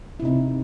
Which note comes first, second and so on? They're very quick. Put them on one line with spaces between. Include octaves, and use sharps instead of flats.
E4 C3 D#4 C4